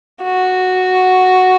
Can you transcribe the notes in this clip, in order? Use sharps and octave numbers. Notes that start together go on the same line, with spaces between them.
F#4